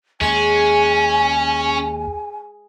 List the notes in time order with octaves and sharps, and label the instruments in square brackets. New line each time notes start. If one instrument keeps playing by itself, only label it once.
[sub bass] D#2 [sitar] G#3 [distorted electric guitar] C#4 [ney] G#5